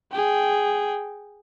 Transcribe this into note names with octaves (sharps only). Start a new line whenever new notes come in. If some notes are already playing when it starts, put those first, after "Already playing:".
G#4 G5